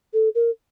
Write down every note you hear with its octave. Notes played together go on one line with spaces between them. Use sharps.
A4
A#4